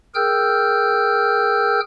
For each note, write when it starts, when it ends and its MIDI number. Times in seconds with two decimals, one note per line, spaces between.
0.15 1.80 68
0.15 1.80 70
0.15 1.80 79
0.15 1.80 88
0.15 1.80 89
0.15 1.80 91